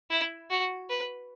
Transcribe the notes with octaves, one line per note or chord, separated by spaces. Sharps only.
E4
F#4
B4